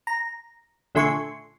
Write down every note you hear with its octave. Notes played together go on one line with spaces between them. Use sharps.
A#5
A#1 D3 A3 G#5 C6 C#6